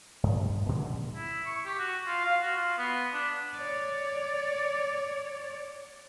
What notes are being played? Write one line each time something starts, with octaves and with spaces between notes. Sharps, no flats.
G2
A#2 D3 F3 G#3
E4
C#6
G4
F#4
F4
F5
F#4
F4
B3
D4
C#5 D5